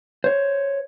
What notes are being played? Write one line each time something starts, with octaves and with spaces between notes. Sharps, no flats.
C5 C#5